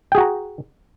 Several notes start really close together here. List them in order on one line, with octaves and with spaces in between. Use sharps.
G5 G#4 F#4 A#5